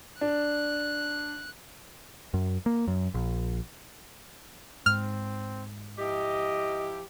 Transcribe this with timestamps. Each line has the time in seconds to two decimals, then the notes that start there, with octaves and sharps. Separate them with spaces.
0.21 D4 F#6
2.34 F#2
2.66 A#3
2.88 F#2
3.14 A#1
4.86 G#2 C4 F6
5.99 F3 E4 G4 D#5